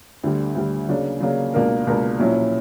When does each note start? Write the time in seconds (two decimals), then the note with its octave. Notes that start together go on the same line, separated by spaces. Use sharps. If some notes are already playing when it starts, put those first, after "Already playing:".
0.23 D2 D3 G3
0.55 D2 D3 G3
0.89 C#3 F#3 A#3 D4
1.20 C#3 F#3 A#3 D4
1.53 C#2 B2 A#3 D4 A#4
1.87 C#2 B2 A#3 D4 A#4
2.19 A#1 A#2 F#3 C#4 E4